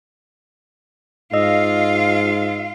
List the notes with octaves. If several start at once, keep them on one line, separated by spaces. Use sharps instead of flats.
G#2 F4 D#5 F5 E6